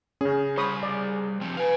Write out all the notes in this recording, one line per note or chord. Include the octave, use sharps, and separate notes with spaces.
C#3 C#4 G#4
G3 C5 C#5 B5 D#6
D5
F3 C4 G4
B4 F5 G#5